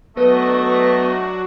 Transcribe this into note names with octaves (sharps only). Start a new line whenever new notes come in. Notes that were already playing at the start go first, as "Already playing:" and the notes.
F#3 A3 B3 D4 F#4 B4 D#5